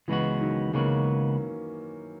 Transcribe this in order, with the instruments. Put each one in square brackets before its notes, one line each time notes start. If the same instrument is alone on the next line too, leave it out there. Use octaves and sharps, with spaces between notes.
[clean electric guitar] C#2 C#3 G#3 B3 F#4 [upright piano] E3
[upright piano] D#3 F#3
[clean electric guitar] C#2 C#3 G#3 B3 F#4 [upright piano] A#3 C#4